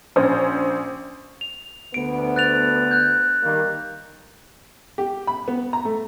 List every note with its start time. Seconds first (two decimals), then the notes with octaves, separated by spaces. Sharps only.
0.16 A#1 C#4 C5
1.41 F7
1.94 D2 B3 D7
2.36 F#6 A6 F7
2.91 F#6 G6
3.43 D#3 G3 A#3
4.98 G4
5.27 B5
5.48 B3
5.73 A#5
5.85 A3